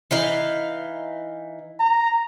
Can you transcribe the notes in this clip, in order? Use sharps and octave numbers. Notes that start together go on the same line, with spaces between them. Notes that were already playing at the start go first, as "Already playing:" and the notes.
E3 D#4 F5
A#5